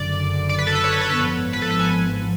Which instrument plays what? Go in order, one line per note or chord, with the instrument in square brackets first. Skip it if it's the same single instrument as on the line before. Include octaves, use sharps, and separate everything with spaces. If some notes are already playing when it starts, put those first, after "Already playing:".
Already playing: [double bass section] F#1 F#2 D3 [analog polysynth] D5
[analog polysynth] D5
B4
A4
B4
C#5
B4
A4
B4
[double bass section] G#1 G#2 F3 B3
[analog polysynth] B4
A4
B4
G#5